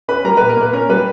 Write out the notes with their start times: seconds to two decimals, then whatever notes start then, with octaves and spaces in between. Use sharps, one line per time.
0.08 C#4 B4 B5
0.24 G3 A#4 A#5
0.37 A#2 B4
0.49 A#4
0.57 A#2 B4
0.73 C#4 A#4
0.89 G3 B4